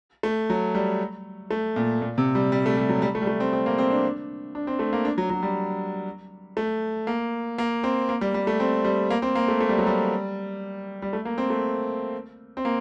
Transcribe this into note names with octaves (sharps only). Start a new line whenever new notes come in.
A3
F#3
G3
A3
A#2
A#2
C3
G3
G3
A3
G3
F#3
G3
A3
G3
A3
C4
C4
A#3
C4
D4
D4
C4
A3
A#3
D4
F#3
F#3
G3
A3
A#3
A#3
C4
A#3
G3
G3
A3
C4
G3
A#3
C4
A#3
A3
A3
G3
F#3
G3
G3
A3
A#3
C4
A3
C4
A#3